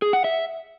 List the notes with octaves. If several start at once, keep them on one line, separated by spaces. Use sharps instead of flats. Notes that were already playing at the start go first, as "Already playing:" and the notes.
G#4
F#5
E5